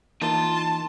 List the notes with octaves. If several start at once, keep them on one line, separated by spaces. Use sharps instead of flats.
E3 A#3 D#4 F4 A5 C6